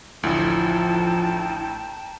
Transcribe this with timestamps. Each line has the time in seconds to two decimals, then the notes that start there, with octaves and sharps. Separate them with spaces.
0.23 A1 D2 F3 E4 G5 A5 A#5